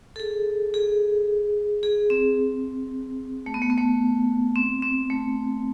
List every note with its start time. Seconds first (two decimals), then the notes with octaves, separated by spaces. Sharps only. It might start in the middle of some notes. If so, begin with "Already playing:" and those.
0.16 A4
0.20 G#4
0.74 G#4
1.83 G#4
2.10 C4
3.46 A3
3.54 B3
3.62 A3
3.70 B3
3.78 A3
4.55 C4
4.82 C4
5.10 A3